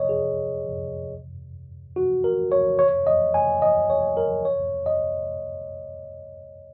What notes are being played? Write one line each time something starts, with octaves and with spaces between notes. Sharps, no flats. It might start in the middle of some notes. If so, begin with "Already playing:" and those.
Already playing: C#5 D#5
G#4
F#4
A#4
C#5
C#5
D#5
G#5
D#5
C#5
A#4
C#5
D#5